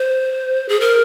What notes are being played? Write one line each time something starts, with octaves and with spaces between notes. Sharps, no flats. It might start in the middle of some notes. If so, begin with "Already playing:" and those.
Already playing: C5
G#4
A#4